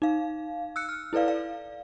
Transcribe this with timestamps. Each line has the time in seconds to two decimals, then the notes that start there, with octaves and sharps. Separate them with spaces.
0.02 D#4 F5
0.76 E6 F#6 C#7
0.89 F6
1.13 E4 A4 B4 D5 F5
1.28 D5 F5